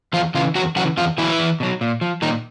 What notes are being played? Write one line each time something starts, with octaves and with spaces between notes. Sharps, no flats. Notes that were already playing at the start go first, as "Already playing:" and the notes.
E2 F3 F4
C#3 E3 F4
E2 F#3 F#4
C#3 E3 F#3 F#4
E2 F3 F4
B2 E3 F#3 E4
E2
B2 F#3
A#2
F3
A#2 D#3 D#4